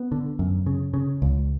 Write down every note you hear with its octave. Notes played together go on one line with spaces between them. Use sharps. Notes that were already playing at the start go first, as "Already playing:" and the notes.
Already playing: B3
D3
F#2
C#3
C#3
C#2